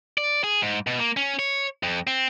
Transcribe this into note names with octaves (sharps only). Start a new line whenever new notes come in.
D5
G#4
G#2
B2
A#3
C#4
C#5
F2
C4